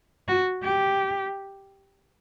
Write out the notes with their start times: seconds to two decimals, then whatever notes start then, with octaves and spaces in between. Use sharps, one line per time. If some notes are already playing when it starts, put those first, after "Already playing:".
0.28 F#4
0.63 G4